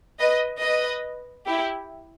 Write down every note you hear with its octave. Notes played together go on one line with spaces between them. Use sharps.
B4 D#5
B4 D#5
E4 G4